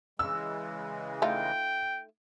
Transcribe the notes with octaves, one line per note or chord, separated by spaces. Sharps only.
C#3 E3 G#3 E6
A3 D#4 F4 G5